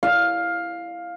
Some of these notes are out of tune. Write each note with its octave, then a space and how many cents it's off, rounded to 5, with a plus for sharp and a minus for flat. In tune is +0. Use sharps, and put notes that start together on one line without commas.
F5 +10